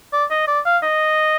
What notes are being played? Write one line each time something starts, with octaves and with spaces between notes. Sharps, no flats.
D5
D#5
D5
F5
D#5